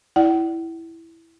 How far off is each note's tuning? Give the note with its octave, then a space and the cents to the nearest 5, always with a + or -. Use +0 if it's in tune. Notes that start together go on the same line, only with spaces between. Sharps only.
E4 +0 D5 +10 F#5 +40